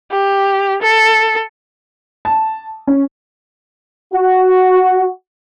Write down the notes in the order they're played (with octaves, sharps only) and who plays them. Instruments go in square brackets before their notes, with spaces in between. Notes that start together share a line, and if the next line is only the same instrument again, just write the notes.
[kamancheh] G4
A4
[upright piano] A5
C#4
[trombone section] F#4